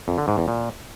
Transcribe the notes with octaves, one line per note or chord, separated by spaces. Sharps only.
F2
D3
G#2
E2
A#2